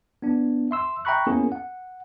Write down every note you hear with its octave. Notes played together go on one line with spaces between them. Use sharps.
B3 D4
E5 C6 E6
E5 G5 A#5 B5 C#6 F#6
A#3 B3 C#4 E4 G#4 A#4
F#5